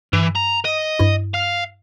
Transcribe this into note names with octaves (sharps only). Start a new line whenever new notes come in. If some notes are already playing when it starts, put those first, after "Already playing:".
G2 E3
A#5
D#5
G2 E4
F5